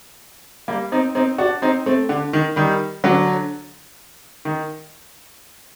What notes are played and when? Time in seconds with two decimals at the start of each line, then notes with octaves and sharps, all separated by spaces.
0.68 G3 A#3
0.92 C4 D#4
1.15 C4 D#4
1.38 D4 F#4
1.62 C4 D#4
1.86 A3 C4
2.09 D3
2.33 D#3
2.56 D#3 G3
3.04 D3 F#3
4.45 D#3